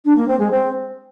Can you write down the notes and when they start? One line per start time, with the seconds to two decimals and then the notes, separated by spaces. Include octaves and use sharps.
0.05 D4
0.16 A#3
0.28 C4
0.39 G#3
0.51 C4